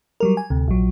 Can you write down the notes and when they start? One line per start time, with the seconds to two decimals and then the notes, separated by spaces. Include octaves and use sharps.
0.20 F#3 G3 A#4
0.37 G#5
0.50 D2 C3
0.68 A#1 F#3